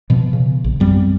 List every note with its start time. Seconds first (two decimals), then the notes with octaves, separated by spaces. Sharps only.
0.10 B2 F3 B3
0.33 C#3
0.64 A#1
0.80 F#2 G3 B3 C4